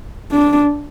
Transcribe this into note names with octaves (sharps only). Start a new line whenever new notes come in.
D4